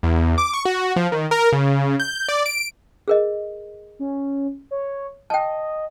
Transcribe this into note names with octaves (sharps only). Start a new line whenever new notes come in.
E2
D6
C#6
F#4
F3
D#3
A#4
C#3
G6
D5
D7
G#4 A#4 D#5
C#4
C#5
D#5 G5 A5